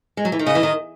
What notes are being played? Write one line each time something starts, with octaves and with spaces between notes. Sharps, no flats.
G#3
F#3
E3
D#3
C#3 D#5
E3
D#3